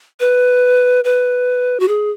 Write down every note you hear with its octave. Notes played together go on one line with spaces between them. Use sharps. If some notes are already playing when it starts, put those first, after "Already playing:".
B4
B4
F#4
G#4